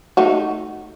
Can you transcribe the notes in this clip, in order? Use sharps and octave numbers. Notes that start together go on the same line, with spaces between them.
A3 D#4 F#4